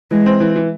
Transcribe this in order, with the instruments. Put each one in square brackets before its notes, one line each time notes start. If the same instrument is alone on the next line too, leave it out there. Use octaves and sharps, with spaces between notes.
[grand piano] E3 [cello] G#3
[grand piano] C4
E3
E3